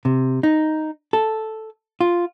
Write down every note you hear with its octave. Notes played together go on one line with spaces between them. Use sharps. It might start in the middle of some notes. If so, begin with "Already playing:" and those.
C3
D#4
A4
F4